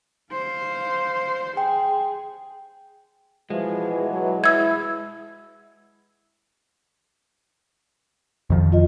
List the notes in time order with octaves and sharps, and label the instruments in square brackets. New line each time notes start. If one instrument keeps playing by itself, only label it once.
[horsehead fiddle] C5 F5
[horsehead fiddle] G#4 [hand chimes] G5
[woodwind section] B2 E3 [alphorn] F3 [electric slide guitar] G#3
[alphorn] F#3
[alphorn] E4 [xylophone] E6 G#6
[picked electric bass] F2 D#3 F3
[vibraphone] F4 D#5